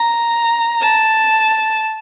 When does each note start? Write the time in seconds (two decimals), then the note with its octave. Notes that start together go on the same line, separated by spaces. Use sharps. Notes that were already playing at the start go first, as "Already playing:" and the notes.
Already playing: A#5
0.82 A5